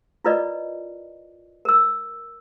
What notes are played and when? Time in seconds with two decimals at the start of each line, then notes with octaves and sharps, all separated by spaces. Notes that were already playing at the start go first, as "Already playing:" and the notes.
0.25 E4 F4 A#4 B4 D5 D#5
1.65 A#4 E6